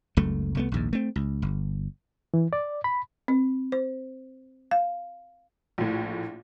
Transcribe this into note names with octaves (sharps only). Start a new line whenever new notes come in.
F#1 C#2 F#2 A3
C2 A3 B3
A#1 D#2 G#2
A3 C4
C#2
G1
E3
D5
B5
C4
C5
F5
A#1 A2